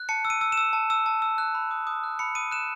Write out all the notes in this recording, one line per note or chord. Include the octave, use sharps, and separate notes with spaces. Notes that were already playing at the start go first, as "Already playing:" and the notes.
Already playing: F#6
A5 C#7
E6
D#7
E6
E7
E6
A5
E6
A5
E6
F#6
B5
D#6
D#6
F#6
B5 C#7
D#6 D#7
F#6 E7